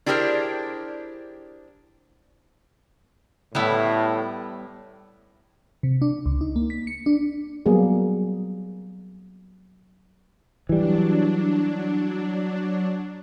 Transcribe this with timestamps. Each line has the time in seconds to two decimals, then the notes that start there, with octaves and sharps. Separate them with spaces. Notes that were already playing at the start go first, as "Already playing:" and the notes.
0.06 D4 E4 G4 G#4 A#4 C5
3.55 A2 G3 B3 E4
5.83 C3
6.02 D4
6.26 C#2
6.41 D#4
6.56 A#3
6.70 B6
6.87 C#7
7.06 D4
7.66 F#3 G3 A#3 B3 G#4
10.69 E3 F#3 G3 D4